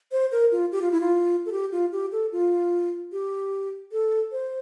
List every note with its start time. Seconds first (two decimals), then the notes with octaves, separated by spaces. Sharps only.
0.12 C5
0.32 A#4
0.51 F4
0.72 G4
0.82 F4
0.91 E4
1.00 F4
1.46 A4
1.52 G4
1.72 F4
1.92 G4
2.12 A4
2.32 F4
3.12 G4
3.92 A4
4.32 C5